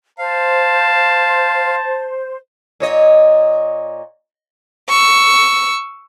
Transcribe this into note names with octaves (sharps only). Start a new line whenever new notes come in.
C5 F5 A5
A#2 C#5 D#5
C#6 E6